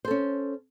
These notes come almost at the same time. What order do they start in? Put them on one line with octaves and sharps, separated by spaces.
C5 A4 C#4